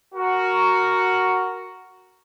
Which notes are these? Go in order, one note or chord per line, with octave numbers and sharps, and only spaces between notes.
F#4 A#4